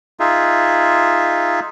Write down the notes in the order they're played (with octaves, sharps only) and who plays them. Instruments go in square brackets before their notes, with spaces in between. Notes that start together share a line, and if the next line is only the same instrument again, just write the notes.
[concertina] D#4 F4 G#4 E5